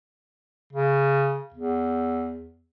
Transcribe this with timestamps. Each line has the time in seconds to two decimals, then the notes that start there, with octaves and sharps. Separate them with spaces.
0.73 C#3
1.54 E2